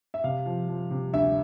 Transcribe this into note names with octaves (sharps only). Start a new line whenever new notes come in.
E5
C3 F5
F3
F3
C3
D2 E5